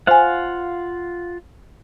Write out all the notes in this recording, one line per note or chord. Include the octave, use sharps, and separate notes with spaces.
F4 C5 F5 F#5 G#5